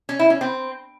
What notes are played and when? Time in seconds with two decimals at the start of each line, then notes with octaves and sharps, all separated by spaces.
0.09 C#4
0.19 E4
0.30 C#4
0.41 C4